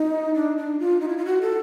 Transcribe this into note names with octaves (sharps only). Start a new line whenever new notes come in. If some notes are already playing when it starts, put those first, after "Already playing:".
Already playing: D#4
D4
D4
F4
D#4
E4
F4
F#4
A4